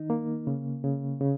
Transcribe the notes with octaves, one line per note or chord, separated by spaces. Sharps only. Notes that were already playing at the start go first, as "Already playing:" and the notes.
Already playing: D#3 D#4
A#3
C#3
C#3
C#3